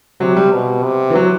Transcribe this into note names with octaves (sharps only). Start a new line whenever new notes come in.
C3 F#3
G3
B2
C3
E3
F#3